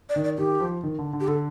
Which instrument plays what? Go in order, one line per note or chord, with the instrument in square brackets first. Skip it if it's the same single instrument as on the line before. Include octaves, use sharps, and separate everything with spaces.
[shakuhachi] D5
[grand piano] D#3
[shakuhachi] D5
[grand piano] D#3 [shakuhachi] G4
[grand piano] F3
D#3
D3
D3
[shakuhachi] G4
[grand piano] D3 [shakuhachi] A4